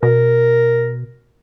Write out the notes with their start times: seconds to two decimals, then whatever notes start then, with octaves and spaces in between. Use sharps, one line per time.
0.03 B2 A#4